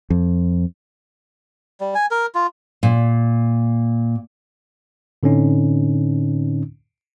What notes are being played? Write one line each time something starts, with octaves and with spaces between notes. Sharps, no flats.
F2
G3
G#5
A#4
F4
A#2
A2 D3 C4 C#4 D#4